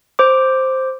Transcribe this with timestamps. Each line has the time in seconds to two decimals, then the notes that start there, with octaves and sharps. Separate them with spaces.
0.19 C5 D6